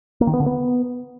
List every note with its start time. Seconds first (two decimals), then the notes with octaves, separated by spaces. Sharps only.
0.21 A#3
0.27 D#3
0.34 B3
0.40 D3
0.46 B3